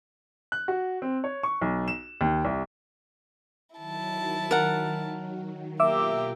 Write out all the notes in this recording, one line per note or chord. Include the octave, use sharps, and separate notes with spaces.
F#6
F#4
C4
C#5
C#6
B1
E7
D#2
C2
D#3 F#3 E4 A5
A#4 F#5
B2 A#3 F4 G4 E5 D6 E6